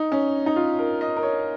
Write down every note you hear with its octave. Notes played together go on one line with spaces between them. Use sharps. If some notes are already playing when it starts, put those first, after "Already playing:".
Already playing: D#4
C#4
D#4
F4
A#4
D#5
A#4
C#5